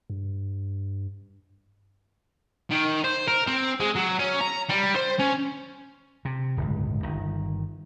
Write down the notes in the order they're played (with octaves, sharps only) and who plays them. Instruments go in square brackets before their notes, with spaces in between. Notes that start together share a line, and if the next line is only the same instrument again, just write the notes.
[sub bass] G2
[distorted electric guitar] D#3
C5
A#4
C4
G#3
F#3
C#4
A#5
G3
C5
C#4
[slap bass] C3
D1 G1 C#2
G1 D#3